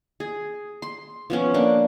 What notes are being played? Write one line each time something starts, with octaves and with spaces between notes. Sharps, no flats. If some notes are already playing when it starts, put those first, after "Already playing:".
G#4
C6
F3 B3 C#4
A#3 D4